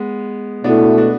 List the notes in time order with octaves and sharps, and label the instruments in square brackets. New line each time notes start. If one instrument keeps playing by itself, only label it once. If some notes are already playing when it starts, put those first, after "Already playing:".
Already playing: [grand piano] G#3 B3
[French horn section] B2 A3 E4 [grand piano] B3 D4
[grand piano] D4 F#4